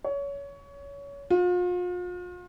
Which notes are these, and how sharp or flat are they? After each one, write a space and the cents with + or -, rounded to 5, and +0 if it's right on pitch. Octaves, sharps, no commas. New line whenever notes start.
C#5 +25
F4 +40